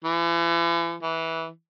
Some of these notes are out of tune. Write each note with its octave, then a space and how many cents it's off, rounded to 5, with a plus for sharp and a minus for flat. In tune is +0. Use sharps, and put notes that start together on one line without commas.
E3 +40
E3 -15